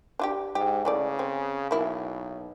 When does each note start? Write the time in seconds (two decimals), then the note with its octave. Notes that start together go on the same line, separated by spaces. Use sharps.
0.19 D4 F4 G4
0.55 G#2 G4
0.85 C#3 E3 A3 D5
1.19 C4
1.71 B1 A#3 E4